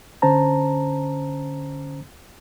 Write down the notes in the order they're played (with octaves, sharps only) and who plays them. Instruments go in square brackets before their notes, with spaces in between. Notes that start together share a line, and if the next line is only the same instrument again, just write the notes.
[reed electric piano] D3 C#4 C5 A5 A#5